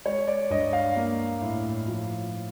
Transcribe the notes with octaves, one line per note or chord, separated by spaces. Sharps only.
G#3 C#5
D5
G2 D#5
F5
A#3
A2
F3